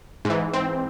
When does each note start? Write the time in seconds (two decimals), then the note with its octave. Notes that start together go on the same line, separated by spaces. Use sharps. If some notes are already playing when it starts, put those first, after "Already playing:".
0.25 G#2 E3
0.53 C4